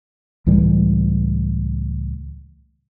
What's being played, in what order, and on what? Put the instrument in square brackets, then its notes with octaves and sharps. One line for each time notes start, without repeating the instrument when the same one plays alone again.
[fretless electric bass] C#2 A2 E3 G3